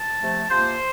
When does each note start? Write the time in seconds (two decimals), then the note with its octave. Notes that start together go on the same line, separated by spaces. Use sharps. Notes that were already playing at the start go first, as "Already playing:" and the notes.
Already playing: A5
0.19 C3 F3 A3
0.50 C3 F3 A#3 F4 C5